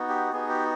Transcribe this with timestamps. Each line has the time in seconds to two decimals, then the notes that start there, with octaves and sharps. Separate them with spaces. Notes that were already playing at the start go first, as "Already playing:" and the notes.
Already playing: B3 D#4 F#4
0.09 G4
0.33 B3 D#4 F#4 G#4
0.49 G4